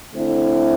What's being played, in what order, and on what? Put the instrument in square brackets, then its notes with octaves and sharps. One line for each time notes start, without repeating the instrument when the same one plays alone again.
[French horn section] D3 A3 C4 E4